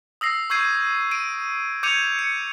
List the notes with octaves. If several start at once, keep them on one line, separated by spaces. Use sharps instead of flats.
D#6 E6 A#6 C7
C#6 E6 G6 G#6 C7 D#7
D7 D#7
D6 G6 G#6 C#7 D#7 F7
C#7